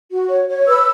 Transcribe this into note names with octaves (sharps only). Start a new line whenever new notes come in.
F#4
C#5
C#5
B4 E6